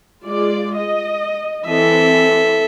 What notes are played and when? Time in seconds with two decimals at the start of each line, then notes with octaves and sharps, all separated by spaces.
0.23 G#3 F4 D5
0.76 D#5
1.67 E3 C4 A4 E5